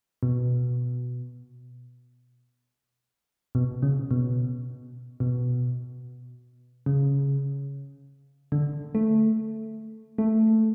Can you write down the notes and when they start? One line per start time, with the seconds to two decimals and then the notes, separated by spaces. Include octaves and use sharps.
0.23 B2
3.55 B2
3.82 C#3
4.11 B2
5.20 B2
6.86 C#3
8.52 D3
8.95 A3
10.18 A3